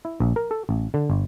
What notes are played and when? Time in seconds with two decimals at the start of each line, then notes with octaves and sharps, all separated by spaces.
0.05 E4
0.20 A#1
0.36 A#4
0.51 A4
0.69 A1
0.94 D3
1.10 G1